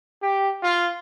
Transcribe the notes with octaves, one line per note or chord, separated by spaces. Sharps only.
G4
F4